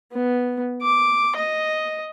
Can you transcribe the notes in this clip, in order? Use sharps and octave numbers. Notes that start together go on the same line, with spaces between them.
B3
D6
D#5